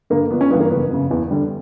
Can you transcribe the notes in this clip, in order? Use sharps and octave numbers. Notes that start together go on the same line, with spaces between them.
G2 D3 A#3
G1 B3
C#4
G2 E3 G3 B3
A#3
F#1 B3
F#2 C#3
E2
D3 G3